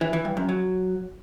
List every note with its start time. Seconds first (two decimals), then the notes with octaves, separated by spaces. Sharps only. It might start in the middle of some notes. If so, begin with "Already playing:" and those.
0.01 E3
0.13 E3
0.25 G2
0.37 F#2
0.49 F#3